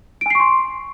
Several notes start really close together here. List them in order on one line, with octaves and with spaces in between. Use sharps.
D7 G#5 C7 C#6 C6